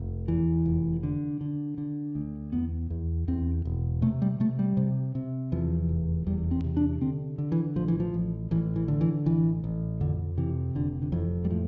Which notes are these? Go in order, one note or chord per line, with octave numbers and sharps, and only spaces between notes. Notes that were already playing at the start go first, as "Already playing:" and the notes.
Already playing: F1
E2 E3
F1
D3
D3
D3
D2
E2 B3
E2
E2 C4
E1
C3 A3
G3
C3 A3
G3
C3
C3
E2 F3
F1
E2 G3
C4
C3
D4
D3 C4
D3
E3
A1 F3
E3
F3
A1
A1 E3
E3
D3
E3
A1 E3
A1
F2 D3
C3 E3
F1 D3
D3
F2 E3
G3
A2 F3